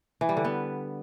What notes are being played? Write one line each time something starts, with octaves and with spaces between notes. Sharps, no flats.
E3
G3
D3
B3